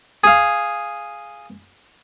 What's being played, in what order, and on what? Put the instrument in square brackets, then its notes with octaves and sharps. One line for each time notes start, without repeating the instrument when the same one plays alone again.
[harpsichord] G#4 F5